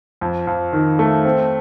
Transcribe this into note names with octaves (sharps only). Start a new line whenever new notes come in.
F2
F2
D#3
A3
C4